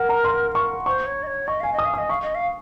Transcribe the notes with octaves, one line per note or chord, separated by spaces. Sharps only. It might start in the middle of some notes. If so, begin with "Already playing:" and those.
Already playing: A#4 F#5
A#5
C6
C#6
C5 C#6
C#5
D#5
C#5
D#5 C#6
F5 G#5
D#5
D#6
F5
D#5 D#6
F5 C#6
D#5
F5